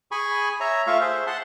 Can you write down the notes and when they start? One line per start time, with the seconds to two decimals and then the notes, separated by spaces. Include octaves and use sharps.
0.11 G#4 G#5 B5 C#6
0.60 C#5 E5 A#5
0.87 A3 F4 E5 F5 C#6
1.01 G#4 C5 E5
1.27 F#5 A5 C6